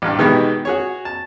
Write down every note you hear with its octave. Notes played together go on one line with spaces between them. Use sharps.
A1 G2
B2 D#3 E3 G#3 G4
F#4 G#4 C#5
A5